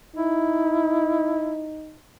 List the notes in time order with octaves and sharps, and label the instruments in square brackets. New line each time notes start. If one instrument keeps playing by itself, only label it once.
[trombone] D#4 [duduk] E4